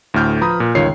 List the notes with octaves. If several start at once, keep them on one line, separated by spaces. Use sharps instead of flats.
D2 A2 F6 G6
F3 B4 A#5 B5 D#6
A#2
G1 C#2 D#3 F4 C#5 C7